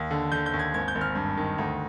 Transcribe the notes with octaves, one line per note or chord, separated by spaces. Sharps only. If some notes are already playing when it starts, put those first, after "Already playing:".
Already playing: D#2
D3
D3 G6
G6
D#2
G#6
G#1 G#6
G6
G#1
F6
G2
D#3
D2